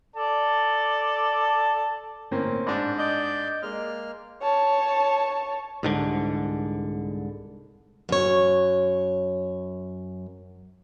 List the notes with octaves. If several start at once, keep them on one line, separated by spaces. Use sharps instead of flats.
A4 D5 A5
G1 A2 A#3 C4 C#4
G#2 D4
D5 D#5 G6
G#3 A#3 F6
C#5 A5
C2 G#2 D3
F#2 C#5